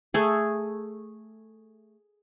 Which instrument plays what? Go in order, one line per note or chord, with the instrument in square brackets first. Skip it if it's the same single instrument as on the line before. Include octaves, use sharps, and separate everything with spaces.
[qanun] A3 G#4